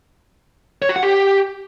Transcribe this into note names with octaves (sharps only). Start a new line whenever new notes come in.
C#5
F#4
F#5
G4